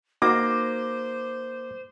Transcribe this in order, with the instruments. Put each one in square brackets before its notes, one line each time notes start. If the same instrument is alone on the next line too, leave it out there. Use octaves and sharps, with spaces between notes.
[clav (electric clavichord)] A#3 [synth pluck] D#4 F#4 A#6 [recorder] C5 [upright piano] D6